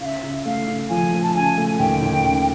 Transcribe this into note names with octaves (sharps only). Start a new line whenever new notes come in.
C#3 E5 F5
C#3
A3 F5
C#3
F3 G#5
A3
A5
C#3 G#5
A3
D#2 G5
D#2
C#3